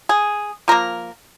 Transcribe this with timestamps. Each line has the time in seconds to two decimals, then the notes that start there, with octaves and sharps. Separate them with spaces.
0.09 G#4
0.68 F3 A#3 A#4